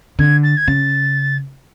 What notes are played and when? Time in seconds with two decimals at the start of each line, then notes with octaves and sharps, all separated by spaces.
0.19 D3 G#6
0.43 A6
0.57 G#6
0.68 C#3 A6